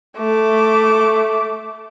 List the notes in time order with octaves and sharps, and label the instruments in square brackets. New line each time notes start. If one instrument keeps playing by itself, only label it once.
[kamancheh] A3 D6